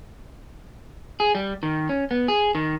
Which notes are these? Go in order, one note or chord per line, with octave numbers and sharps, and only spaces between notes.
G#4
G3
D#3
C#4
B3
G#4
D#3